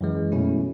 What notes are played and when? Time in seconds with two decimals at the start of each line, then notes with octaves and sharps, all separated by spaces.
0.01 F#2 E3 G#3
0.32 B2 F#3 A3 C#4 E4